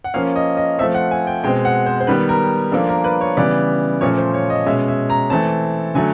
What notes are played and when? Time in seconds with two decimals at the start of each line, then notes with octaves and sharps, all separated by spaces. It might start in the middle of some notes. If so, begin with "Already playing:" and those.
0.04 F#5
0.14 F3 A#3 C#4 F5
0.36 D#5
0.57 D#5
0.78 F3 A3 C4 E5
0.94 F#5
1.11 G#5
1.27 G5
1.43 B2 G#3 C4 G5
1.65 F#5
1.86 C5
2.00 C5
2.07 D#3 G3 B3 B4
2.29 A#4
2.72 F3 A#3 D4 A4
2.89 A#4
3.04 B4
3.21 C#5
3.37 C#3 E3 G3 B3 D5
4.01 A#2 F3 A3 C#4 C#5
4.18 C5
4.34 C#5
4.50 D#5
4.66 B2 G#3 C#4 E5
4.88 E5
5.10 A#5
5.30 E3 A3 C4 A5
5.95 D3 F#3 A3 G#5